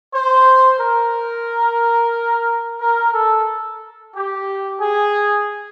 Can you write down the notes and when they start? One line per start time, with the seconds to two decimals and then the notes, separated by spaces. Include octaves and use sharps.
0.13 C5
0.80 A#4
2.81 A#4
3.14 A4
4.15 G4
4.81 G#4